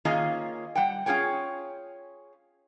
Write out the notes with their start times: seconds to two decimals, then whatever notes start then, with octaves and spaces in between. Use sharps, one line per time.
0.05 D#3 A#3 C#4 F4 G#4 D#5
0.75 G3 F#5 G5
1.06 C#4 F4 G#4 C#5 G5